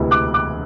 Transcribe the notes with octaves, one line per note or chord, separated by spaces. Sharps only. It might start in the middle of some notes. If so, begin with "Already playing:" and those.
Already playing: E1 D2 C3 E3
D6 F#6
D6 F#6